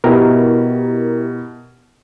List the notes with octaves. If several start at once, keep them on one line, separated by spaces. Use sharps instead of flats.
B2 E4 G4 A#4